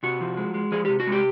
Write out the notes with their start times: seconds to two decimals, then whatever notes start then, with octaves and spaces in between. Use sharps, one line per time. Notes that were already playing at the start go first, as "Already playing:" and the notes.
0.03 C3 F#4
0.21 F3
0.37 G#3
0.54 G#3
0.72 F3 G#4
0.85 C3 G4
1.00 F#4
1.07 G#3
1.12 G4